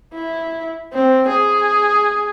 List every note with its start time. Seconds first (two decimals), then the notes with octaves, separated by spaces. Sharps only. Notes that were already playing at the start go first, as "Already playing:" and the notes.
0.14 E4
0.93 C4
1.29 G#4